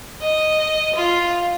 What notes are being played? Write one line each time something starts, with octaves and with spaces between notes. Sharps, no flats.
D#5
F4